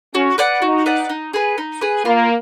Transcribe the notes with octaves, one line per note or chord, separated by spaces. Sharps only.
C#4 F#4
B4 D5 F#5
D#4 F#4
B4 D5 F#5
D#4
G#4 B4
D#4
G#4 B4
A#3 F4